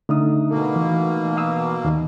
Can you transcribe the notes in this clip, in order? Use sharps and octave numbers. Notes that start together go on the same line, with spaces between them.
D3 A3 D#4 D#6
B2 A#3 A4
E3
F5 D#6 E6
D#2 D#3